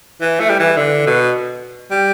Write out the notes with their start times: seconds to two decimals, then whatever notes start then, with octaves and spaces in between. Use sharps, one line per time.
0.21 E3
0.40 A3
0.49 G3
0.59 E3
0.77 D3
1.06 B2
1.91 G3